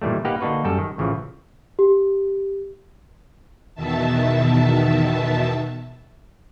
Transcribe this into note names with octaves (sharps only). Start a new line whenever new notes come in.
A#2 D#3 E3 G3 A3
A#3 D#4 G4 B4 F5 F#5
D3 A#3 D4 D#4 F#4 B4
F#2 G3 A4
D#3
A1 C#3 E3 F3
G4
E2 B2 D#3 E5 A5